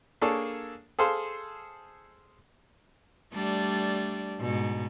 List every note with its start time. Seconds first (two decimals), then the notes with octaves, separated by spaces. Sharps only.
0.22 A#3 D4 G#4 A4 C#5
0.99 G#4 A4 C5 F5 C6
3.33 G3 A3 D4
4.40 G#2 B2